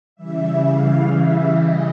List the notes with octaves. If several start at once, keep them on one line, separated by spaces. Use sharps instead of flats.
C#3 E3 G3 E5
F5
E5
D#5